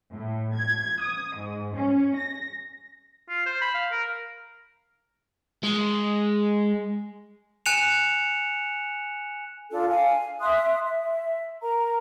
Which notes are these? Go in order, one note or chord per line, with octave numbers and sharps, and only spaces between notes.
A2
G#6
D#6
G#2
C#4
A#6
F4
C5
B5
F5
A#4
G#3
G#5 F#6 C#7 E7 F7
D4 F4 A4
F5 G#5
E5 C6 D#6 F#6
E5
A#4 A#5